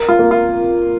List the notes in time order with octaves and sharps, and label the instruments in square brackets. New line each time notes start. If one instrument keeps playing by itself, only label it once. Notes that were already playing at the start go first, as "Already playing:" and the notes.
Already playing: [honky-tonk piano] A#4
[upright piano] F4
[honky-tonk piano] A#3
[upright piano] F4